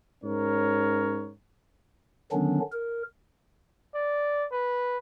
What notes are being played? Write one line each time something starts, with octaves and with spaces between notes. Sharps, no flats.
G#2 C#4 A#4 C#5
D3 D#3 F#3 B3 C#4 D4
A#4
D5
B4